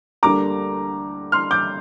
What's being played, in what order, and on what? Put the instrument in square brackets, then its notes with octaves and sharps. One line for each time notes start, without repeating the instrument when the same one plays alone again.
[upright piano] D2 D3 G3 A#3 A#5 D6
C6 F6
D6 G6